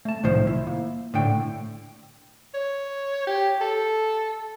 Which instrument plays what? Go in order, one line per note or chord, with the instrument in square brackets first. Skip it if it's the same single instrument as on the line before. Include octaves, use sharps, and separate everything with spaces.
[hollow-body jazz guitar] A3 A5
C2 A2 D#3 F3 C5
E4
A#3
A2 D3 G5
[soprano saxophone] C#5
G4
A4